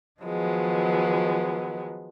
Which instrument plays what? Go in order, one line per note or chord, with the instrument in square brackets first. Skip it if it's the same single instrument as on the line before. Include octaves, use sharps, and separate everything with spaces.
[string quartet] D#3 F3 F#3 G#3 B3